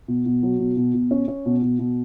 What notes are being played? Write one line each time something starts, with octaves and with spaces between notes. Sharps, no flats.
B2
B2
F#3
B2
B2
B2
C#4
C#4
B2
B2
B2